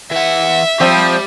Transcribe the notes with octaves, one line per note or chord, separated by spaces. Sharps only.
E3 E5 F#5
F3 G3 C4 G4 B5